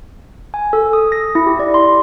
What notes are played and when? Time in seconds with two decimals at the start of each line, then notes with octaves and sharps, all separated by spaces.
0.54 G#5
0.73 A4
0.93 D#6
1.12 A#6
1.35 E4
1.46 G4
1.59 D5
1.74 C6